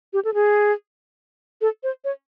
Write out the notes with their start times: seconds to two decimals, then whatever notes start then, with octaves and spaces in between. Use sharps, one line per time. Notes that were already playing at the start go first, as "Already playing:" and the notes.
0.13 G4
0.25 A4
0.34 G#4
1.61 A4
1.83 C5
2.04 C#5